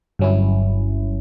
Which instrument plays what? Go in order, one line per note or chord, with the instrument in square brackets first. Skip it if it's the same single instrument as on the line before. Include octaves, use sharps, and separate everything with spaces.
[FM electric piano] G1 G2 F#3 C#4 E4